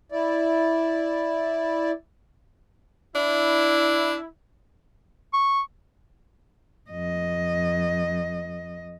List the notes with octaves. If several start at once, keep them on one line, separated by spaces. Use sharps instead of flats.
E4 D5
D4 E4
C#6
F2 D#5